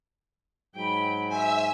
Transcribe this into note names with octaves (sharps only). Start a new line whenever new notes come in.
G#2 F#3 G5 B5
C5 E5 G#5 E6